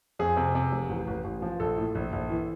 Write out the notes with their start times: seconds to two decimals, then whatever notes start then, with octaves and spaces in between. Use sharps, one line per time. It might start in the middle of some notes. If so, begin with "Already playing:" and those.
0.19 F2 G#4
0.37 C3
0.55 C3
0.72 F1
0.89 A1
1.07 A1
1.24 A1
1.42 F3
1.60 A#1 A4
1.77 A2
1.95 A#1
2.12 A#1
2.30 E3